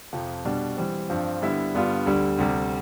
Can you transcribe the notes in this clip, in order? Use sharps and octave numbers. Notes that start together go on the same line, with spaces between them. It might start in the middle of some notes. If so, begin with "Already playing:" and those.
F2 C3 F3
B2 G3 D4
E3 G3 C4
G2 F3 C4
D3 G3 B3 E4
G2 D3 G3 B3 F4
D2 D3 G3
D2 C3 G3